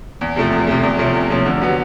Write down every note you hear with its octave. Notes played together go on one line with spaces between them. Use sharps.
E2
C3 F3 A3
E2
C3 F3 A3
E2
C3 F3 A3 C#4
E2
C3 F3 A3 C#4
D3
F#3 B3